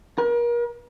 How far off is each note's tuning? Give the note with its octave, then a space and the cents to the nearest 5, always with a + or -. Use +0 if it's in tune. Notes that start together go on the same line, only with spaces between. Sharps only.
A#4 +35